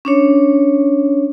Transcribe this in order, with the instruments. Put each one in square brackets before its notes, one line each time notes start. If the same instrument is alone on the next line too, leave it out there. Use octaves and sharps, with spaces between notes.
[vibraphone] C#4 D4 C#5